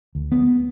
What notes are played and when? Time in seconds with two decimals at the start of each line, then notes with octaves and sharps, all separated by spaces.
0.15 D2
0.32 B3